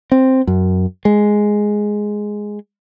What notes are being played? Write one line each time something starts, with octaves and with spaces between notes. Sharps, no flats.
C4
F#2
G#3